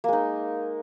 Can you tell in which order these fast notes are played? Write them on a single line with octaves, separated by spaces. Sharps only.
A#3 G#3 D#4